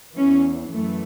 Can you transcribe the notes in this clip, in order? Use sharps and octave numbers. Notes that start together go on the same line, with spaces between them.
E2 E3 C#4
F#2 E3 A3